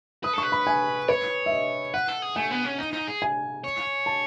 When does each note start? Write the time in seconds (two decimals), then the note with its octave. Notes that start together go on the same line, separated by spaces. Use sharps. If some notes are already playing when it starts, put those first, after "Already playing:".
0.23 B4 D#6
0.33 A4
0.38 B4 C#6
0.52 B5
0.67 G#5
1.08 B4 C#5
1.46 E5
1.52 D#5
1.94 B4 F#5
2.08 A4
2.22 G#4
2.36 A3 G#5
2.51 B3
2.65 C#4
2.78 D#4
2.93 D#4
3.07 G#4
3.22 G#5
3.64 C#5
4.06 A5